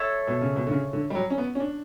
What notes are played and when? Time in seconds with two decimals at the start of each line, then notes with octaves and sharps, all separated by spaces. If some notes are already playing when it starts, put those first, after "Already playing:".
Already playing: E4 A4 C#5
0.27 B2
0.41 C#3
0.56 B2
0.67 D3
0.71 C#3
0.93 D3
1.10 G3
1.15 F#3
1.30 C#4
1.38 B3
1.55 C#4
1.60 D4